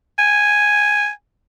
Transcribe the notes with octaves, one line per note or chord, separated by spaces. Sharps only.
G#5